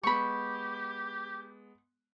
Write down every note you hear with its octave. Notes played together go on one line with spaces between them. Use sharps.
G#3 B3 G4 B5 C#6